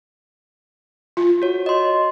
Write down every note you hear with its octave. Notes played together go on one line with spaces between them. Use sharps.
F4
F#4 C#5
D#5 C6